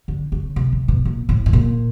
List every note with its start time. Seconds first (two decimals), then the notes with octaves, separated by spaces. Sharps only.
0.08 D3
0.32 C#3
0.56 C3
0.73 C3
0.88 B2
1.05 A#2
1.29 A2
1.46 A2
1.53 A#2